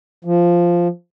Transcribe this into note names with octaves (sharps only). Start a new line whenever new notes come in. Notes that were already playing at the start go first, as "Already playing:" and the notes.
F3